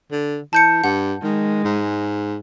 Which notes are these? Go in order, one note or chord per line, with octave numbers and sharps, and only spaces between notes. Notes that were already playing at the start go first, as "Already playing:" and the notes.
D3
E3 A5 G6 C#7
G2 F#5
D#3 G#3
G#2